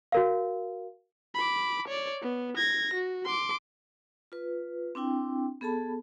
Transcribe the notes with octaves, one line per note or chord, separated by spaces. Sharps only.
F#4 A#4 F5
B5 D6
C#5 D5
B3
G#6 A#6
F#4
C6 D6
F4 B4
C4 D4 E4 G5
B3 G#4 A4 A5 B5